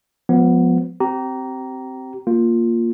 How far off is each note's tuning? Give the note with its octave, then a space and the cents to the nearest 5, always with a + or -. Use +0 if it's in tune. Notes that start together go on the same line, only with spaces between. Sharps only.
F3 +30 G#3 +10 B3 +0
C4 +0 G4 -30 A#5 +0
A#3 +0 F4 +0